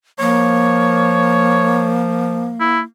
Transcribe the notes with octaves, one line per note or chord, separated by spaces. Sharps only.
F3 A#3 C#5
E4